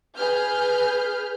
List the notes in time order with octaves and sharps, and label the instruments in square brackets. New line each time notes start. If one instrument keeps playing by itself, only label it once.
[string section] G#4 B4 F6 G6